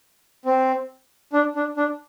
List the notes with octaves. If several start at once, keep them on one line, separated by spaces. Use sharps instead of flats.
C4
D4
D4
D4